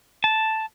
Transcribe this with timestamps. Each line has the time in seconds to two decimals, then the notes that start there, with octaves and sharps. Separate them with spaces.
0.24 A5